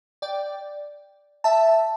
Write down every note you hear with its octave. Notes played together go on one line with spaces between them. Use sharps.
D5 G5
E5 A5